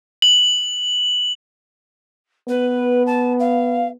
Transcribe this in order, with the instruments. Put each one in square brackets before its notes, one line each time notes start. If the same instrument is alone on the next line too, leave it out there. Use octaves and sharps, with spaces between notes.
[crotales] F#7
[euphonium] B3 [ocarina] B4
[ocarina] A5
F5